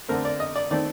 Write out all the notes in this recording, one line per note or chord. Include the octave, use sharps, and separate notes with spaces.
D3 A3 C4 A#4
D5
D#5
D5
D#3 A3 C4 D5